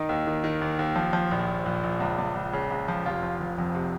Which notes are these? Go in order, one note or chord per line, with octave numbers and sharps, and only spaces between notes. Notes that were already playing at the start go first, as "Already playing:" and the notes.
Already playing: D#3 D#4
D#2
D#3
D#3
D#2
D#2
F3
F3
A#1
A#1
A#1
A#1
C#2
C#2
C#2
C#3
C#2
F3
F1 F4
F3
F1
F2
C3